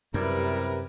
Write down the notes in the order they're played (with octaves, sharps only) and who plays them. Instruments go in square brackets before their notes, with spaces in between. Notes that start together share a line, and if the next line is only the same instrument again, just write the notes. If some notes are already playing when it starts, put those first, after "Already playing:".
[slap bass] F#2 [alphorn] C3 [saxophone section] G3 E4 [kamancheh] A#4 B4